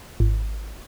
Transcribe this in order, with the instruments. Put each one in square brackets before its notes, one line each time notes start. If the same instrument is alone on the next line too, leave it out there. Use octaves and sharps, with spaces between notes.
[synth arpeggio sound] G#1